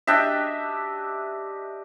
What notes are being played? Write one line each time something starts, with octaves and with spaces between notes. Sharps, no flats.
D4 G4 D#5 E5